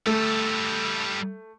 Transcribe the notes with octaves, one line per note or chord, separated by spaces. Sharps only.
G3 A3 A4